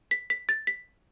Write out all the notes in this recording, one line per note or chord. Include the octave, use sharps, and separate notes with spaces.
B6
B6
A6
B6